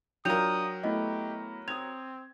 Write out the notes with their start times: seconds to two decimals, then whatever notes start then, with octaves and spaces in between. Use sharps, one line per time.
0.25 F#3 D4 F4 A#4 G5 D#6 G6 F7
0.84 A3 B3 E4 G4 D#5
1.68 C4 D#6 G#6 F7